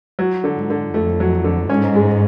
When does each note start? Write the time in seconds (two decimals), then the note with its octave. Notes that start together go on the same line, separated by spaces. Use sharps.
0.19 F#3
0.44 D3
0.56 G#2
0.70 D3
0.94 F2 A3
1.20 F#3
1.44 D3
1.70 G#2 C#4
1.95 G#3